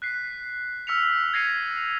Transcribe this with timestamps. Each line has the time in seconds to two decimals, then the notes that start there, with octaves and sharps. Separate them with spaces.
0.02 F#6 B6 C7
0.87 E6 F6 B6 C#7 F7
1.34 G#6 A#6 C7 C#7 D#7 F7